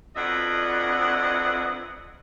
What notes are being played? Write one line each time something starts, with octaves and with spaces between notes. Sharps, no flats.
F2 B2 D4 D#5 E5 F#5